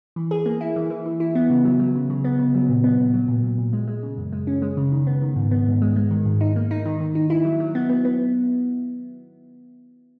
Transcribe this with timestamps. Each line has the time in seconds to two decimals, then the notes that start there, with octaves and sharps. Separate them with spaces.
0.16 E3
0.31 G#4
0.46 A#3
0.61 E4
0.76 E3
0.90 E3
1.06 E3
1.20 E4
1.35 B3
1.50 C#3
1.65 F#3
1.79 F#3
1.95 C#3
2.10 C#3
2.24 B3
2.39 C#3
2.55 F#3
2.69 A#2
2.84 B3
2.99 A#2
3.14 F#3
3.28 A#2
3.43 A#2
3.58 A#2
3.73 G#3
3.88 G#3
4.03 C#3
4.18 F#2
4.33 G#3
4.47 C#4
4.62 G#3
4.77 C#3
4.92 D#3
5.07 B3
5.22 D#3
5.36 G#2
5.51 B3
5.66 G#2
5.82 G#3
5.96 G#3
6.11 D#3
6.25 G#2
6.41 D#4
6.56 A#3
6.71 D#4
6.85 D#3
7.00 D#3
7.15 D#4
7.30 E4
7.45 F#3
7.60 F#3
7.75 B3
7.89 B3
8.05 B3